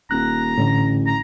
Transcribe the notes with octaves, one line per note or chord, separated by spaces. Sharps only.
D#1 A#5 F#6
A1 A2 D3
A#5